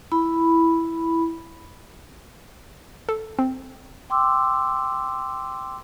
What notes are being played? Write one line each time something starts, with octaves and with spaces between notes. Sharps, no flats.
E4 B5
A4
C4
G5 C6 D6 E6